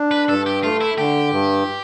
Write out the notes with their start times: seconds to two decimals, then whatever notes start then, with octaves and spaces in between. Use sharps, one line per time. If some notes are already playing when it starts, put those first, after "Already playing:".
Already playing: D4
0.11 B4
0.29 G2 A4
0.46 G4
0.63 A3 F4
0.81 E4
0.98 D3 G4
1.32 G2